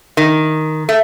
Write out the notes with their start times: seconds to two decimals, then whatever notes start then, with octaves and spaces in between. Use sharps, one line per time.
0.17 D#3
0.89 A3